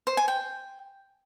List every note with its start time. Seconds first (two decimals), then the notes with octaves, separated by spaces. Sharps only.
0.07 C5
0.17 G#5
0.28 G5